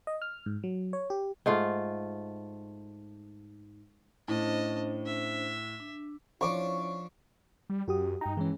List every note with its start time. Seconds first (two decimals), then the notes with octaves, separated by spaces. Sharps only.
0.07 D#5
0.22 F6
0.46 G#2
0.64 F#3
0.93 C#5
1.10 G4
1.46 G#2 A3 F4
4.28 A2 C#4 D4 C5 D#5 A5
5.06 E5
5.80 D4
6.41 F3 C#4 D4 E4 C#5 C#6 D6
7.69 G3
7.88 F#2 F#4 G4 D#6
8.21 G2 D#4 G5 A#5
8.37 E3 G#3 C#4